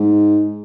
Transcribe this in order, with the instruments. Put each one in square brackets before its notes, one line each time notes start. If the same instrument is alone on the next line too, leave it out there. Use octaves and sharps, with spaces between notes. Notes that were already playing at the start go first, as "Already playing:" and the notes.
Already playing: [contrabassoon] G#2